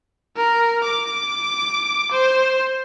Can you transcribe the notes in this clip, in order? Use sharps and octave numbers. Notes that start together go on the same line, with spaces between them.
A#4
D6
C5